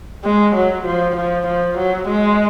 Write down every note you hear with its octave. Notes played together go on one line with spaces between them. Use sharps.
G#3
F#3
F3
F3
F3
F#3
G#3